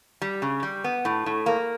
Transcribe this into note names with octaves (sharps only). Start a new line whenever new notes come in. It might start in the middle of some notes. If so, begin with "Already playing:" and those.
G3
C#3
G3
B3
A2
A2
A#3